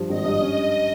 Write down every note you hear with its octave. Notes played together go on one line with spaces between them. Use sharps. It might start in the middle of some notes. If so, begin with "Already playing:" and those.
Already playing: G2 F3
G#1 D#5
G2
C#4